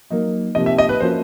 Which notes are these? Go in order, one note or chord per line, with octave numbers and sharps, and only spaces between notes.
F#3 A#3 D#4
C3 F3 A#3 D#4 G4 D#5
E5
D#5
B4
F3 A#3 C#4 F#4 C5